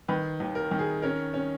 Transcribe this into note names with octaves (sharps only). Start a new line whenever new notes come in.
D#3 B4
D#2
A#4
D#3
G#4
C#4 A#4
C#4